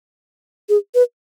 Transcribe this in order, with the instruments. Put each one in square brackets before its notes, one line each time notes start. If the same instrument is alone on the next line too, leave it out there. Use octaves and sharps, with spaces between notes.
[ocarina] G#4
B4